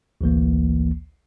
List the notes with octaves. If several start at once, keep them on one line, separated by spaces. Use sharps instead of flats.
A1 D2 E3 A#3